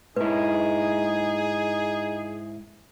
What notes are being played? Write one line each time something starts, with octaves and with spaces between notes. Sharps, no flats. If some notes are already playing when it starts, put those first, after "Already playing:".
G#2 D#4 E4 G#4 B4